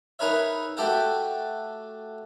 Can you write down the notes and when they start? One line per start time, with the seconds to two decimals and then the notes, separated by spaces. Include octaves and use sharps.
0.19 D#4 G#4 A#4 B4 C#5 E5
0.77 A3 F#4 G4 A4 F#5 G5